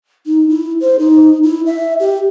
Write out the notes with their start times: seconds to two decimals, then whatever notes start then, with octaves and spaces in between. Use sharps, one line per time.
0.26 D#4
0.49 E4
0.81 C5
0.99 D#4
1.43 E4
1.66 E5
2.00 G4